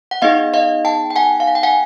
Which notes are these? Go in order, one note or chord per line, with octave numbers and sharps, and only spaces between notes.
F#5
B3 D#4 G#4 D#5 F5
D#5 F5
G5 A5
G5
F#5 G#5
F5
F#5
G5
F#5 G#5